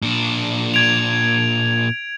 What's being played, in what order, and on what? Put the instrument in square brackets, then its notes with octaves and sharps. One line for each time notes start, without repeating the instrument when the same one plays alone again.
[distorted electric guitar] A#2 D4
[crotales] G#6 D7 F7